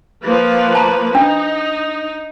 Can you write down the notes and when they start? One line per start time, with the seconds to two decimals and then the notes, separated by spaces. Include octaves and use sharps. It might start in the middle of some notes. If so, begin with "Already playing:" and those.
0.24 F3 A#3 B4
0.75 A5 A#5
1.15 D4 D#4